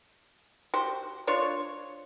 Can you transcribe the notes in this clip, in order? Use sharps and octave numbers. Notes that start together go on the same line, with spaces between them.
F#4 G4 C5
D4 F4 C5 C#5